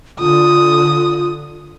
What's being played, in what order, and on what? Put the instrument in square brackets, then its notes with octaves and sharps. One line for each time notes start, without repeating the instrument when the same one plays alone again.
[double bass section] D3 [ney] F4 [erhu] D#6